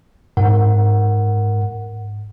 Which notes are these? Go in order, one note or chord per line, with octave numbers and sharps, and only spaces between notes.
G#2 A#4 F#5